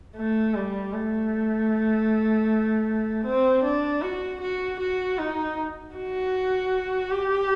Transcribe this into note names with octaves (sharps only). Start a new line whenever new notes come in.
A3
G3
A3
C4
D4
F#4
F#4
F#4
D#4
F#4
G4